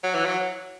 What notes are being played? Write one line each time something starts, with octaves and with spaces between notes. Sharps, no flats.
F#3
E3
F#3